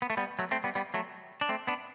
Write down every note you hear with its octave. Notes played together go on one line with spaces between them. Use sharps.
B3
A3
G3 B3
F#3 A3
A3 C4
G3 B3
G3 B3
F#3 A3
D4
A3 C4
B3 D4